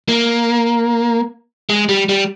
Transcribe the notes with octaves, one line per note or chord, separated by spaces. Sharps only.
A#3
G#3
G3
G3